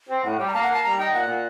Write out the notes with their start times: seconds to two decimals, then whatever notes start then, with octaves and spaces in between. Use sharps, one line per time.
0.09 C4
0.23 A2 F#5
0.38 G3 G5
0.48 A#5
0.53 A#3 A5
0.63 F#5
0.68 A#3
0.73 A5
0.84 G3 A#5
0.98 D#4 G5
1.13 A#2 F#5
1.28 A#2